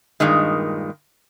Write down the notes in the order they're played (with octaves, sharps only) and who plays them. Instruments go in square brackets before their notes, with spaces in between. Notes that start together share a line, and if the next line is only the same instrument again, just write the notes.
[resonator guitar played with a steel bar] G2 A#2 D#3 G#3